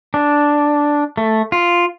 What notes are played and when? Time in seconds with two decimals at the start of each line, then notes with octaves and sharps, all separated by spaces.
0.14 D4
1.17 A3
1.52 F4